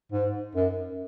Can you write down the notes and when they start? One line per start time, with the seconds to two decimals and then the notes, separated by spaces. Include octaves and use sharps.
0.12 G#2
0.55 F#2